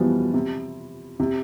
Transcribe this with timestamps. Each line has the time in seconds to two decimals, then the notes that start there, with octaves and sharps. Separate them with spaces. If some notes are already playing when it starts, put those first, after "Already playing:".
Already playing: B2 E3 F3 G3
0.34 C3
1.20 C3